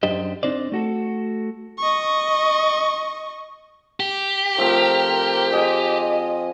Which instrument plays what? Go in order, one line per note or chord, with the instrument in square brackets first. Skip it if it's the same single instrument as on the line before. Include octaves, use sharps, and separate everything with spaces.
[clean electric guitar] F#2 D4 G4 C5 D#5
C4 D4 D#4 C5 D5
A3 F#4 A4
[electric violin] D#5 C#6
[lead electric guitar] G4
[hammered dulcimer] F3 A3 C4 [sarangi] A#4
[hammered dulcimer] G#4 G#5 [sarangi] D#5